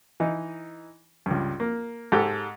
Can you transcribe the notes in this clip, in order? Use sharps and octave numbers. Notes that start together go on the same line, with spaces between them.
E3 D#4
C#2 G2
A#3
G#2 G4 A4